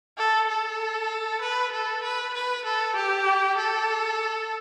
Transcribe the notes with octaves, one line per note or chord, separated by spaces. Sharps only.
A4
A4
B4
A4
B4
B4
A4
G4
A4